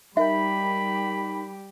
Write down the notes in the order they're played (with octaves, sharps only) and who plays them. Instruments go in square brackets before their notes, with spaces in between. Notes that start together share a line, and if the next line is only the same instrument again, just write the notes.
[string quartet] G3 G4 [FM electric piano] D#4 A#4 G5 [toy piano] E5 [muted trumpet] B5